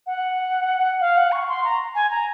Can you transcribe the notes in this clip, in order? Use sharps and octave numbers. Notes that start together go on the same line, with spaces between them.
F#5
F5
F#5
C#6
C6
A#5
G#5
A#5